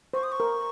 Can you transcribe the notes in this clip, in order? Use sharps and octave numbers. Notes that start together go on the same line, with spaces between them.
C5 C#6
D#6
C#6
A#4